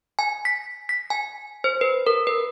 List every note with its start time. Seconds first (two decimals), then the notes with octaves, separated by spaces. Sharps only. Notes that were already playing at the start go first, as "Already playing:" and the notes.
0.19 G#5
0.45 B6
0.89 B6
1.10 G#5
1.64 C5
1.81 B4
2.07 A#4
2.27 B4